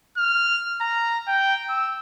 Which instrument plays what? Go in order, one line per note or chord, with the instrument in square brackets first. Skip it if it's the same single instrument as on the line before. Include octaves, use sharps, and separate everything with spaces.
[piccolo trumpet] F6
A#5
G5
E6